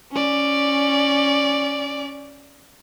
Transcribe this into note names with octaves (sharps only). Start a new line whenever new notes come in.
C#4 D5